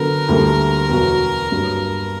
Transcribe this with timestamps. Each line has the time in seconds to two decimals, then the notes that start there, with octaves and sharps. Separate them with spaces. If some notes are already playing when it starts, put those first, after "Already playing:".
Already playing: D3 F#3 B3 A#4
0.28 D2 D3 G3 A#3
0.90 E2 B2 F#3 B3 F#4
1.52 G2 F#3 A#3